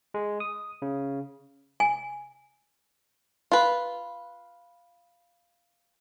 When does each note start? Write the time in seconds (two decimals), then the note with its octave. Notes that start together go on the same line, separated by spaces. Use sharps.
0.14 G#3
0.40 D#6
0.82 C#3
1.80 G#5
3.52 F4 B4